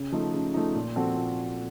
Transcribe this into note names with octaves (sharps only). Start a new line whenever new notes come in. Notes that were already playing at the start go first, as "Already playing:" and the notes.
Already playing: C#3
F3 A3 D#4
C#3
F3 A3 D#4
A#2
F3 C4 F#4 A4
A#2